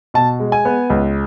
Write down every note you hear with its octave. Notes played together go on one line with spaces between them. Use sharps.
B2 A5
G#3
G#5
B3
C#2